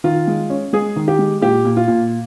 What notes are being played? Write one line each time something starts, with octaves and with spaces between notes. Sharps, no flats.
D#3 F4
G#3
C#4
G#3 G#4
D#3
G4
G#3
A#2 G4
A#2
F4
A#2